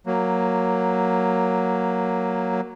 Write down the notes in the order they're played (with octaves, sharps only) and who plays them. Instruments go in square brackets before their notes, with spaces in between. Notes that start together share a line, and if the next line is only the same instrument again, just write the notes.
[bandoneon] F#3 A#3